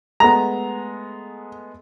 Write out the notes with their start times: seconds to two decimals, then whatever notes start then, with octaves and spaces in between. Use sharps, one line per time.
0.20 G#3 A3 B3 A#5